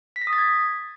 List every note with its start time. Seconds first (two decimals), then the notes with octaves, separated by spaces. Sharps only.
0.16 B6
0.22 A#6
0.27 D#6
0.33 A6
0.38 G#6